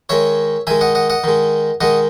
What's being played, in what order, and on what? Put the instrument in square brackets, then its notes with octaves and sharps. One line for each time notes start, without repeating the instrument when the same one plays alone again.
[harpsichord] D#3 G#3 C#5 E5
D#3 G#3 E5 G#5
D#5 F#5
D#5 F#5
D#5 F#5
D#3 G#3
D#3 G#3 D#5 F#5